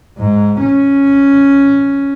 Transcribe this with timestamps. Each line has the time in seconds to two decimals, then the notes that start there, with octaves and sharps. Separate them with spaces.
0.18 G#2
0.60 C#4